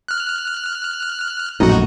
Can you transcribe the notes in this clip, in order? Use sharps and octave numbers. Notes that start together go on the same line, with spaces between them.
F6 F#6
A#1 F#2 A2 D#4 F#4